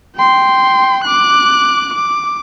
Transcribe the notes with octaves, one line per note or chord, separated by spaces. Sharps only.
G5 C6
D6 F#6
D6